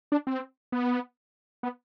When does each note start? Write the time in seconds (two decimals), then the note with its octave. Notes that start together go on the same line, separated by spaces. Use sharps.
0.12 D4
0.27 C4
0.72 B3
1.63 B3